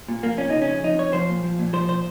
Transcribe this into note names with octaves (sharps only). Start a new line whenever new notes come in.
A#2
F3 A#3
A#2 C#4
C#3 D#4
C#4
F3
F2 D#4
F2 C#5
F3 C5
A#2
F3
A#2
F3 C5
A#2 C5